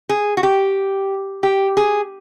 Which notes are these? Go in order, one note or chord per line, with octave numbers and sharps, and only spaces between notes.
G#4
F#4
G4
G4
G#4